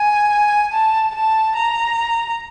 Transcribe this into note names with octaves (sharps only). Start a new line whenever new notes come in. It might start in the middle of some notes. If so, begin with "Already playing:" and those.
Already playing: G#5
A5
A5
A#5